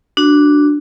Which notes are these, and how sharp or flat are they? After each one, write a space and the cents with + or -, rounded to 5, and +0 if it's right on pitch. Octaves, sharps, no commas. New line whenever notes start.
D4 +0 F#4 +0